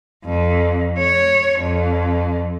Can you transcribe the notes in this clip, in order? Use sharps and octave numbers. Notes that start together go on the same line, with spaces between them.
F2
C#5
F2